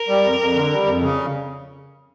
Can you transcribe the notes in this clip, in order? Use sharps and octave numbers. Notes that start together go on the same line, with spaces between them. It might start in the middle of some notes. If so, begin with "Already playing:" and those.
Already playing: A#4
G3
F2
F2
D3
G3
F2
C#3